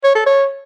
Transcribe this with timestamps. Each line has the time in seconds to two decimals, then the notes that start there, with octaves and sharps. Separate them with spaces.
0.04 C#5
0.15 A4
0.26 C#5